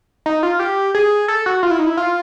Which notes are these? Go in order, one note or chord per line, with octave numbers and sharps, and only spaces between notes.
D#4
F4
G4
G#4
A4
F#4
F4
E4
D#4
E4
F4